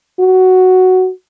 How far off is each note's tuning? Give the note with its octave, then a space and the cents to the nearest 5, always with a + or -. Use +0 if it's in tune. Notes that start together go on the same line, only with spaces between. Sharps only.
F#4 +5